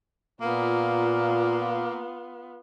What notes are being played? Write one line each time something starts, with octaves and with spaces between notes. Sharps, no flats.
A#2 A#3 B3 F4